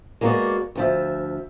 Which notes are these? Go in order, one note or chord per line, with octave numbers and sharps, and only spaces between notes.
G#3 A#3 B3 C#4 F#4 D5
D2 F3 E5